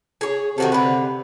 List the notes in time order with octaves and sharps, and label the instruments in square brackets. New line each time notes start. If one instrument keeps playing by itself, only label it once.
[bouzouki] G#4 C#5
[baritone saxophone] C3 [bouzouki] D#3 F#4 A4
[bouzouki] D3 B4